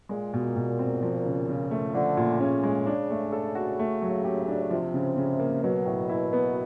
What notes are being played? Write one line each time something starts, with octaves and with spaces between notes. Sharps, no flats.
A#2 G#3
B2
B2
C4
F3
C#3
C#3
A3
D3 F3
A#2
C#3 C#4
G#3
D4
A3
A4
F#4
A3
F#3
G4
D4
C3 F3
C#3
C#3
A#3
B2 F#3
A2
E4
B3